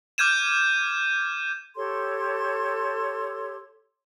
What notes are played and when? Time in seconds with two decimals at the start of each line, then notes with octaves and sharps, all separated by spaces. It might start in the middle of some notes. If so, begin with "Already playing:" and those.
0.18 D6 F6 G6 G#6 D#7 E7
1.76 G4 A4 C#5 C6